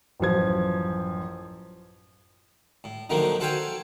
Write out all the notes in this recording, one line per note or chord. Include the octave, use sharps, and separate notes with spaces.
A1 F#2 F3 G#6
A2
D3 D#3 F3 F#3 A3 A#3
F#4 A4 C5 F5 G5 G#5